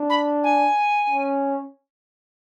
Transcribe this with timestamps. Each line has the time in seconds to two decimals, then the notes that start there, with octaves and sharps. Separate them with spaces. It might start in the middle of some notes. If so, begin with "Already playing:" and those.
Already playing: D4
0.10 B5
0.44 G#5
1.10 C#4